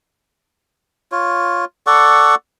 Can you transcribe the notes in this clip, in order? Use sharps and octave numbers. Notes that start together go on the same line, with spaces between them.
F4 C#5
A4 D5 F#5 C#6